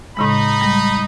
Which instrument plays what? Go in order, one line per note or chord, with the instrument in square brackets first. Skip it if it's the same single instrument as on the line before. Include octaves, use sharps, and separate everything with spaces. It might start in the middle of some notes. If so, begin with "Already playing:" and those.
[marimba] A2 C#3 G#3 [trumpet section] D#4 B5
[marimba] G3 G#3